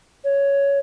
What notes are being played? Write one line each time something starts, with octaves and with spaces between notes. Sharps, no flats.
C#5